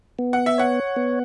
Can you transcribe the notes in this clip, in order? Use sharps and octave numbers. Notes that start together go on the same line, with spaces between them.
B3
F#5
E5
C#5 F#5
B3